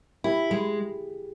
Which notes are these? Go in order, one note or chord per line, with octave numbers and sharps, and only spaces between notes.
E4 G4
G#3 G#4